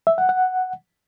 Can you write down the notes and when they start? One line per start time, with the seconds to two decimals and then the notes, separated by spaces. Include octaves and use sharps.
0.07 E5
0.18 F#5
0.29 F#5